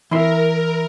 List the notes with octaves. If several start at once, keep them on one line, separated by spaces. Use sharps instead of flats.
E3 E4 A#4 E5 C6